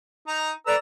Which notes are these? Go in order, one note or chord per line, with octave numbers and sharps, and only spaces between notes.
D#4 A#5
A4 B4 D5 A#5 E6